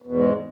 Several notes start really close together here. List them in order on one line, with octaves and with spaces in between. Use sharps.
B2 E2 G#2 G#3